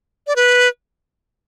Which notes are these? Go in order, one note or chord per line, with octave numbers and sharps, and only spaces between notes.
D5
B4